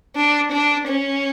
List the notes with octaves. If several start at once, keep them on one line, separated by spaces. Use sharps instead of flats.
D4
D4
C#4